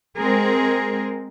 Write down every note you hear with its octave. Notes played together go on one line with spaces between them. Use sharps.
G#3 C4 G#4 A#4